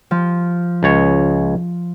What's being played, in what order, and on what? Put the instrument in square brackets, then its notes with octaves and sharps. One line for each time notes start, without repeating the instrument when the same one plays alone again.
[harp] F3
[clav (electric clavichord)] C#2 C#5